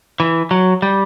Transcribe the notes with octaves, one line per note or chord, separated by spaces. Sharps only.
E3
F#3
G3